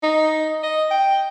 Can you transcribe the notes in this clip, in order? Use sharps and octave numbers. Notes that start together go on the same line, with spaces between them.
D#4
D#5
G5